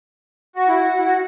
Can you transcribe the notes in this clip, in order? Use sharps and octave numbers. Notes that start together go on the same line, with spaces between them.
F#4 F#5
E4
F#4
E4
F#4